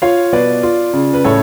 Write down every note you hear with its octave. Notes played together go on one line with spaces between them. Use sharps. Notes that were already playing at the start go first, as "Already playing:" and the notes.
F4 C#5 F5
B2 B4 D5
F4
C#3
B4
A2 A4 C#5